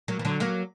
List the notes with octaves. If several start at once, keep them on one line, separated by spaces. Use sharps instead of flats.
F#3 A#3
E3
D3 F#3
F#3 A#3